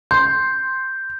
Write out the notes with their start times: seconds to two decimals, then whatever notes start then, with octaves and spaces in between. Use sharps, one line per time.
0.11 C6 G6